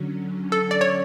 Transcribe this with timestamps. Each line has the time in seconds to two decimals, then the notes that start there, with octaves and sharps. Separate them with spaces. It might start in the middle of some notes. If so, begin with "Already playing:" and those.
Already playing: D3 F#3 C#4
0.52 A4
0.71 D5
0.81 C#5